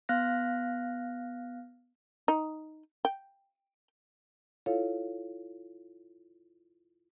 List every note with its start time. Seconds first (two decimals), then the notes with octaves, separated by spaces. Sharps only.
0.09 B3 F5 F6 F#6 A#6
2.28 D#4
3.05 G5
4.66 E4 F4 A4 C#5 F5